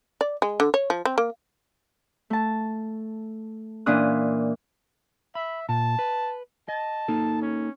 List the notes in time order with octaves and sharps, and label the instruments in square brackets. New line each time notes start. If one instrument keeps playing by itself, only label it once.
[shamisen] D5
G#3
D3
C#5
F3
C4
A#3
[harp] A3 A5
A#2 E3 C#4 D4 D#6 F#6
[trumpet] E5 [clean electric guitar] B5
[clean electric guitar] A#2 [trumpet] A5
[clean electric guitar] B4
[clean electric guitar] D#5 [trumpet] A5
[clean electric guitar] A#3 D#4 A4
[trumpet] C#4